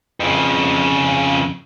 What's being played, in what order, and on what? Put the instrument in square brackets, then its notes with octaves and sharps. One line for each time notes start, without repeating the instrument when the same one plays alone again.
[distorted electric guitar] F2 C#3